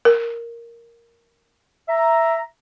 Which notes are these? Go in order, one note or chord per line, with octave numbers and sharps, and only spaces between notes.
A#4
E5 A#5